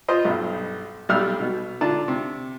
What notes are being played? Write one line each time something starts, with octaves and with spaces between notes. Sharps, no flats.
F4 C5 D#5
B1 G2
B1 G3 E6 F6
B2
D3 F4 D5 A5
C3